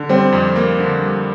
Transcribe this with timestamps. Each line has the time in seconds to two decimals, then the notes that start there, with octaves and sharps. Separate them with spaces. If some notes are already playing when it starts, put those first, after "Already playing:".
Already playing: D3
0.09 G3 C4
0.32 F2
0.56 A#3
0.80 D3
1.02 G3